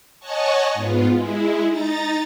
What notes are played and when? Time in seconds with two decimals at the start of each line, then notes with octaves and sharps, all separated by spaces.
0.20 C#5 D#5 F#5 G#5 A5 C#6
0.74 G#2 B3 F4
1.11 G#3 E4
1.68 D#4 A#5 A6